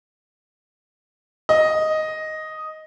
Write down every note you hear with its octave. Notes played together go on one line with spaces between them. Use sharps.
D#5